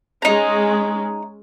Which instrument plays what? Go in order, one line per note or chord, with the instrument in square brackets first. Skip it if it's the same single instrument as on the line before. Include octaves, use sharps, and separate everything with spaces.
[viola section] G#3 C#4 [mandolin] D#4 A#5